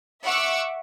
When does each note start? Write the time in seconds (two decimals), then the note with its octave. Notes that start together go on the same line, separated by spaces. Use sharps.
0.24 E5 F#5 C#6 D6 E6